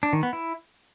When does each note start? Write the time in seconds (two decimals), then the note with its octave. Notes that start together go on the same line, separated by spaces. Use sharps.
0.03 D4
0.13 D#3
0.23 B3
0.33 E4